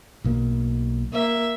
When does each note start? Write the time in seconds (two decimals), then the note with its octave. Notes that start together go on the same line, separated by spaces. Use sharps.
0.24 B1 B2 A#3
1.13 A#3 E5